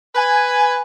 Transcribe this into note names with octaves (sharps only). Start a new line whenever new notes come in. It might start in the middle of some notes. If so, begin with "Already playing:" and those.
B4 G#5